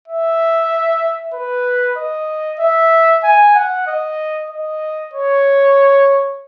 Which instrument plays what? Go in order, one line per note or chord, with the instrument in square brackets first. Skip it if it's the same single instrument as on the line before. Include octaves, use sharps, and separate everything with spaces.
[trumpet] E5
B4
D#5
E5
G#5
F#5
D#5
D#5
C#5